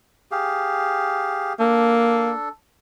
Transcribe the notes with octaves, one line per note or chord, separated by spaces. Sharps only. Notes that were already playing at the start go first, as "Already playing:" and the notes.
G4 G#4 F5
A#3 D4 A4